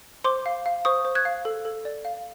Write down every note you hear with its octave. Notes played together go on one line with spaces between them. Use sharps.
C5 C6 D6
F5
F5
C5 C#6 D#6
C5
F#6 G#6
F5
A4
A4
D5
F5